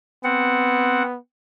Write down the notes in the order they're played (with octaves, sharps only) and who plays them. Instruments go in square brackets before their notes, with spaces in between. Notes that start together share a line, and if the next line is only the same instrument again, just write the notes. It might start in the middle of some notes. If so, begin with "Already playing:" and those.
[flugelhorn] B3 [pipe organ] C4 F#5